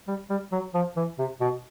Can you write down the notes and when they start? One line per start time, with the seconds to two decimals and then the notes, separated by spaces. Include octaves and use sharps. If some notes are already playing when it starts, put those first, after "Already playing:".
0.07 G3
0.30 G3
0.52 F#3
0.74 F3
0.96 E3
1.19 C3
1.41 B2